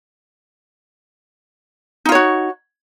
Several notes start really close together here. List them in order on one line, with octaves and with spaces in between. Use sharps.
D#4 F4 C#5 F#4